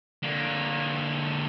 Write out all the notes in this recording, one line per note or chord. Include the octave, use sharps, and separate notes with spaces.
D3 A#3